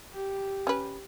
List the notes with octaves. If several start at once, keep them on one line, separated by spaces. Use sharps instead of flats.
G4
C#4 B4